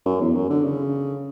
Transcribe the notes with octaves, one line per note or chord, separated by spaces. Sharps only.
F#2
E2
F#2
D3
C#3